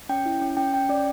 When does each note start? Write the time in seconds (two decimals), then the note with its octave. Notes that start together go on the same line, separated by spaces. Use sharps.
0.09 C#4 G5
0.26 E4
0.41 C#4
0.57 C#4 G5
0.73 C#4 G5
0.89 C#4 D5